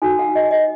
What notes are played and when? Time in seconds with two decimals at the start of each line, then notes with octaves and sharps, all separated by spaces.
0.02 D#4 F#4 A4 G#5
0.19 F#5
0.35 D#5
0.51 D#5